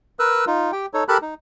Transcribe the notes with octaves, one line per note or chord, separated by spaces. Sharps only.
A#4 B4 E6 F#6
D#4 F4
G4 G5
D#4 A4 C#5
G4 A4 A#4 A5 B5 F#6
D#4